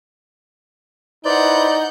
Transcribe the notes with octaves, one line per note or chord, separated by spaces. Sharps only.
D#4 E4 B4 C5 D5 F#5 G6